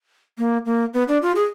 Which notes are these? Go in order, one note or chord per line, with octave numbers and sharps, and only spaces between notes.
A#3
A#3
B3
D4
F4
G#4